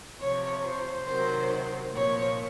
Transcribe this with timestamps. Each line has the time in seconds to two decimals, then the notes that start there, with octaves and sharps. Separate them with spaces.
0.20 C3 F3 C#5
0.64 C5
1.07 C3 D#3 F#3 C5
1.94 A#2 F3 C#5